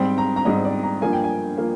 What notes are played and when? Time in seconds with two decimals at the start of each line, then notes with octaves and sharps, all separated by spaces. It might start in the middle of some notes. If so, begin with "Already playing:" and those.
Already playing: G#2 G3 C4 G5
0.18 A#5
0.36 A#5
0.45 G#2 G3 C4 D#5
0.65 D5
0.83 A#5
1.02 G2 F3 A#3 G#5
1.13 G5
1.24 G#5
1.57 F3 A#3